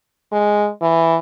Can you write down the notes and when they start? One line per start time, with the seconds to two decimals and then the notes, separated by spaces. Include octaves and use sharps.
0.32 G#3
0.82 E3